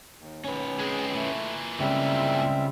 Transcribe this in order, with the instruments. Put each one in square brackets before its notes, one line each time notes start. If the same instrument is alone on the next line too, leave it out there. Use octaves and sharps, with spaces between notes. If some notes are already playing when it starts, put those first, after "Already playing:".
[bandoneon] D#2
[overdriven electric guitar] C#4 B4
[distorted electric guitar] G#3 C4 [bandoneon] G#4
[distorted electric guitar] A#2 E3 [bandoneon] A3
[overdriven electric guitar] C#3 G#3 [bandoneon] G3 C4 E5